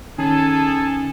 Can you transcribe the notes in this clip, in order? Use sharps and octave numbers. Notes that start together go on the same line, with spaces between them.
D#3 C#4 G#4 A4 G#5 A5